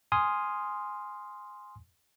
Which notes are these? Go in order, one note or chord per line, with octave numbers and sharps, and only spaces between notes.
G#5 C6 D#6 F6